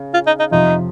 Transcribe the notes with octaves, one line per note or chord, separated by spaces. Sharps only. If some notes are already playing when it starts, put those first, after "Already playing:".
Already playing: C#3
F4
D#4
D#4
F2 C3 F3 D#4